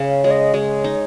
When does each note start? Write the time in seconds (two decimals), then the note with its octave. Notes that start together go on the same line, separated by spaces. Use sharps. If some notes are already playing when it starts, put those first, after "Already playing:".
Already playing: C#3
0.09 F5
0.24 G#3 C#5
0.31 D#5
0.54 G#3 C#5
0.84 D#4